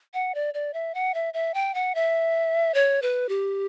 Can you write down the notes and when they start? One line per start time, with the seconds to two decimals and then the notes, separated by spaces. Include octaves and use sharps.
0.14 F#5
0.35 D5
0.54 D5
0.74 E5
0.94 F#5
1.14 E5
1.34 E5
1.54 G5
1.75 F#5
1.95 E5
2.74 C#5
3.02 B4
3.29 G4